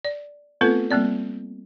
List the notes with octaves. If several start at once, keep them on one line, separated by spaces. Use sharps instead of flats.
D5
A3 B3 C4 F4 A4 B4
G3 A#3 C4 D5